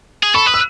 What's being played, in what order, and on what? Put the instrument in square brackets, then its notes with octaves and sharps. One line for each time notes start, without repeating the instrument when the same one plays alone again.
[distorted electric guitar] G#4
[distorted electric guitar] A4 [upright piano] B5 C#6
[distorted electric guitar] B4 [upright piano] D#6
[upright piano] E6